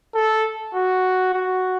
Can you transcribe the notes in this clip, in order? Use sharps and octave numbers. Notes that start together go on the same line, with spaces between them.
A4
F#4
F#4